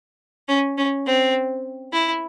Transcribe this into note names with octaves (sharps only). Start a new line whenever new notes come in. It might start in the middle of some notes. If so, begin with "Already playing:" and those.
C#4
C#4
C4
E4